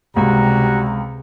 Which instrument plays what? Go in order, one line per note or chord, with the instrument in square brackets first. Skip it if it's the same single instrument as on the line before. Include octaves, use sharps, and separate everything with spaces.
[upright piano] C#2 [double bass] C3 [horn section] G3 F#4 A#5